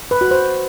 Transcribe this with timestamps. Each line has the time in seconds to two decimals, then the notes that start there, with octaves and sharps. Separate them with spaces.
0.11 B4
0.21 F#4
0.31 C5